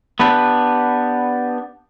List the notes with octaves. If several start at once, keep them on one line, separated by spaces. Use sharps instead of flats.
B3 D4 G4 B4